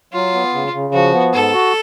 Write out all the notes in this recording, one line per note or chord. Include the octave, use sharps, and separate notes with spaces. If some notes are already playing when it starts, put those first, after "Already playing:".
F#3 F4
B3
C#3
C#3
F3 F#4
B3
G#2 A4
F#4